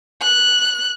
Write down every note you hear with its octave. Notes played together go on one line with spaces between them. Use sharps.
F#6